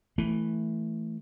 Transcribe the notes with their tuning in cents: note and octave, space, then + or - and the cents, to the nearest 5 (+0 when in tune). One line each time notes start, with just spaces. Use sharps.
E3 +0 A3 +0